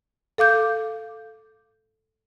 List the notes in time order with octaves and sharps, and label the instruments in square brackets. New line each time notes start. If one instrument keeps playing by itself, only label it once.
[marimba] A4 F5 D6 G6